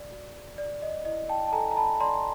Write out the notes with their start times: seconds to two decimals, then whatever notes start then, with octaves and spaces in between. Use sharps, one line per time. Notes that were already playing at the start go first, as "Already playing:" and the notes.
Already playing: D5
0.11 F#4
0.58 D5
0.82 D#5
1.05 E4 D#5
1.29 G5 A5
1.47 A5
1.52 A4 G#5 A#5
1.71 A#5
1.77 A5 B5
2.00 D5 A#5 C6